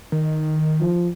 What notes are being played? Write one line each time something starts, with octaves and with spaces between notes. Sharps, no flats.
D#3
F3